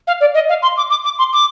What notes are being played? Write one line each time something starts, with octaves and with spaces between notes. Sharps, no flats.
F5
D5
D#5
F5
C6
D6
D6
D6
C6
D6